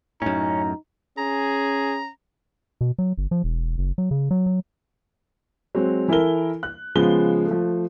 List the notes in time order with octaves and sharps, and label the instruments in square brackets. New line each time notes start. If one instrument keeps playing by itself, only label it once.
[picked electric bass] F#2 A2 [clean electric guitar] C#4 [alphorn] D#4 [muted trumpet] A#5
[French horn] C#4 [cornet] G#4 [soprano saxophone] A#5
[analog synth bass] B2
F#3
G1
F3
E1
F#1
F#3
C#3
F#3
F#3
[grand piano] F#3 G#3 C4 F#4
E3 E4 A4 A#4 G7
F#6
C#3 F3 G#3 B3 G7
F3 A3